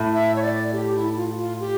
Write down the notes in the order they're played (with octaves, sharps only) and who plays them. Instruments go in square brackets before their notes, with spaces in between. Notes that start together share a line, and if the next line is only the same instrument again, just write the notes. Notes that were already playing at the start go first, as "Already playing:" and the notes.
Already playing: [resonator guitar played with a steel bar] A2
[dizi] E5
C#5
D5
G4
E4
F4
F4
G4